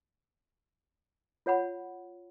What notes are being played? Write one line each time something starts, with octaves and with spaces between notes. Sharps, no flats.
F4 C#5 F#5 B5